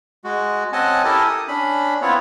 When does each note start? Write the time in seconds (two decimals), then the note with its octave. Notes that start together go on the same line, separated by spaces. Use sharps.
0.24 G#3 F#4
0.73 C4 C#4 D#5 F#5 G#5 A5
1.04 E4 G4 A4 A#4 G#5 A5
1.28 D#6
1.48 C#4 D4 B5
2.02 B3 C4 E4 F4 C#5